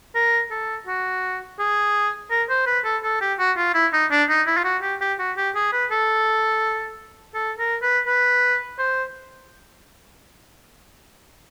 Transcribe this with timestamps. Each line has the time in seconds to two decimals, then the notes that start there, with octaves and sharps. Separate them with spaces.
0.15 A#4
0.51 A4
0.87 F#4
1.59 G#4
2.31 A#4
2.49 C5
2.67 B4
2.84 A4
3.03 A4
3.21 G4
3.39 F#4
3.57 F4
3.74 E4
3.93 D#4
4.11 D4
4.29 D#4
4.47 E4
4.57 F4
4.64 F#4
4.82 G4
5.01 G4
5.19 F#4
5.37 G4
5.55 G#4
5.73 B4
5.91 A4
7.35 A4
7.59 A#4
7.82 B4
8.07 B4
8.79 C5